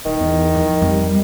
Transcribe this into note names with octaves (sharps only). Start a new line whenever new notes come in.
D#1 D#3
E2
F3
F2 G3